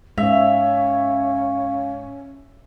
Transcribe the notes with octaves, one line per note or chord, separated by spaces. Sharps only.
G#2 C#4 E5 F5